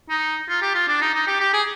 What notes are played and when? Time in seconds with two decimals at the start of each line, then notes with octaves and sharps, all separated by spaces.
0.10 D#4
0.49 F4
0.62 G4
0.75 F4
0.88 D4
1.01 D#4
1.14 D#4
1.27 G4
1.40 G4
1.53 G#4